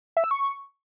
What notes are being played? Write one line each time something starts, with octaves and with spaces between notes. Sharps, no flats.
E5
E6
C#6